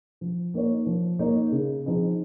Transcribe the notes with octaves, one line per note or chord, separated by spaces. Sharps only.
F3
A#3 D#4 A#4 C#5
F3
A#3 D#4 A#4 C#5
C#3
F3 C4 D#4 G#4